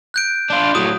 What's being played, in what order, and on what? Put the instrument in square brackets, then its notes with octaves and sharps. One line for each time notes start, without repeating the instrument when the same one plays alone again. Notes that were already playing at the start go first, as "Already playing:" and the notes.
[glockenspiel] F#6 G6 D7
[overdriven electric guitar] D4 F4
[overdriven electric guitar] A2 F#3 [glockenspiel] D#6